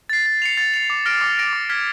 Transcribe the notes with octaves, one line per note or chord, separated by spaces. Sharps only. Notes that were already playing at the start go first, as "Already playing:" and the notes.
A6 C7
A6
C#7 F7
A6
C#7 F7
D6
F6 A#6 D7
D6
F6 A#6 D7
D6
F6 G#6 B6